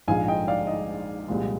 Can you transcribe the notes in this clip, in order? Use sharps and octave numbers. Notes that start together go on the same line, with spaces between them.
A#1 G#2 F3 G#3 F5 G#5
D#5 G5
D5 F5
D#5
C2 A#2 F3 G#3